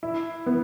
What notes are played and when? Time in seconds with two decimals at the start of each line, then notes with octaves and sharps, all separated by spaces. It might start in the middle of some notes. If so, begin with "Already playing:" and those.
0.03 E4
0.46 B3